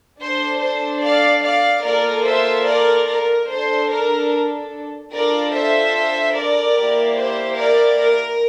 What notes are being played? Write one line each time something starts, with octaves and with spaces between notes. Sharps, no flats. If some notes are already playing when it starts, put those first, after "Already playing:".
D4 A4 C5
C5
D5 F5
D5 F5
A#3 F4 A4 A#4 D5
C5 E5
A#4 D5
A#4
D4 A4 C5
A#4
D4 F4 A4 A#4 D5
C5 E5
A#4 D5
A#3 E4 G4
C5
A#4 D5
A#4